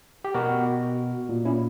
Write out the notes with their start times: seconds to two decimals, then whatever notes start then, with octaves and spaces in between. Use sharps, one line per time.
0.25 G4
0.34 B2 F#4 A#4
1.29 A#2
1.45 C#4 E4